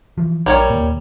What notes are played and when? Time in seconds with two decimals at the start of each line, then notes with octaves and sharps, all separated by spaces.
0.18 E3 F3
0.46 A#1 G3 A#4 C#5
0.70 D#2 A#2